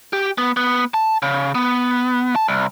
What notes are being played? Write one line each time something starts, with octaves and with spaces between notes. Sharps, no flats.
G4
B3
B3
A5
C#3
B3
A5
C2